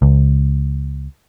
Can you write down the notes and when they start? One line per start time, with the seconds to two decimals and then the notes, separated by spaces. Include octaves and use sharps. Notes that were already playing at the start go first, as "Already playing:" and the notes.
0.02 C#2